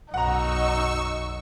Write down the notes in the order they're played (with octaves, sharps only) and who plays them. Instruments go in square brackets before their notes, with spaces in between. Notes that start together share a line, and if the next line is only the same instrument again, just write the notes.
[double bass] B1 F#2 [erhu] D#4 [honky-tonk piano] F#5 A#5 [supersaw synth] C#6 E6